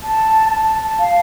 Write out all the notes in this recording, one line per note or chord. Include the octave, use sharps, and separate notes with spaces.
A5
A5
F5